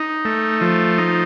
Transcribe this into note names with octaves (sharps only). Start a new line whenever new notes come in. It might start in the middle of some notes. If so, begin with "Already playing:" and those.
Already playing: D#4
A3
F3
D#4